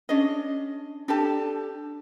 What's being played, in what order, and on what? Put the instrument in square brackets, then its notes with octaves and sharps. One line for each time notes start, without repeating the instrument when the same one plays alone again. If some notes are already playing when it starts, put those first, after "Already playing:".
[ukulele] C#4 D4 G#4 D#5
D4 G4 A4 A5